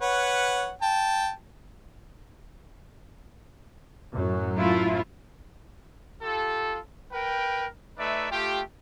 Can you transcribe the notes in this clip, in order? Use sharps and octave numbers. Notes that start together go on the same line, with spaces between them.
B4 C#5 F#5
G5 A5
F#2 A2 F#3
A3 E4 F4
F4 G4 A4
A#4 B4 G5
A3 D#4 B4 D5 E5
A3 F4 G4